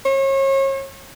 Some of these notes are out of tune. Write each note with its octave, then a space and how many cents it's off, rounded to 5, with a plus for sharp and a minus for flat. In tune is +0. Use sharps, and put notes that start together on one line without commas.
C#5 -35